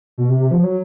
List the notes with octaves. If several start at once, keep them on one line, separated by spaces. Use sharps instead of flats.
B2
C3
C3
F3
F#3